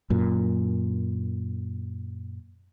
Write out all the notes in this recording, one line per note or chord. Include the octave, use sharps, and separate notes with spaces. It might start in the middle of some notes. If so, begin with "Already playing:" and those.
F#2 A#2